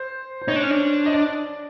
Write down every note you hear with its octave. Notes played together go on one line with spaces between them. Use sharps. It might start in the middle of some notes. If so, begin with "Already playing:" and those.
Already playing: C5
C5
D#4 C#5
D4
C#4
D4
D#5
D5